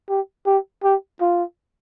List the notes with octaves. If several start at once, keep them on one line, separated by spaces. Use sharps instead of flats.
G4
G4
G4
F4